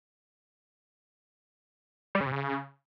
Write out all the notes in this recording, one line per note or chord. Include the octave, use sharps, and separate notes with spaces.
G3
C#3
C3
C#3